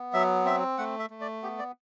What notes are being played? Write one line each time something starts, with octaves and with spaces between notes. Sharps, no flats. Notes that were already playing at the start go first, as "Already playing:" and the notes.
Already playing: B3
F#3 E5
C4 E5
A3 F#5
E5
A3
D5
B3 G4
D5